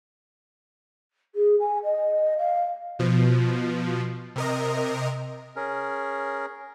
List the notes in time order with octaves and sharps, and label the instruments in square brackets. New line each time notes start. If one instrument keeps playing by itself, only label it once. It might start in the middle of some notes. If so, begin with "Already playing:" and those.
[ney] G#4
G#5
D#5
F5
[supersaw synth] B2 F3
C3 A#4 D#5
[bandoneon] C#4 G#4 A#4